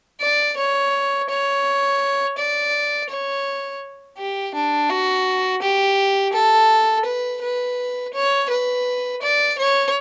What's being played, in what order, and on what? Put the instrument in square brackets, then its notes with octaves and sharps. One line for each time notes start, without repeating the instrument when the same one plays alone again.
[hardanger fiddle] D5
C#5
C#5
D5
C#5
G4
D4
F#4
G4
A4
B4
B4
C#5
B4
D5
C#5